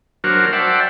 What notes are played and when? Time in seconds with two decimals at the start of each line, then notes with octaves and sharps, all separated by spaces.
0.24 F#3 D4 F#4 A#4 C5 F6
0.53 C5 D5 E5 F#5 G5 A5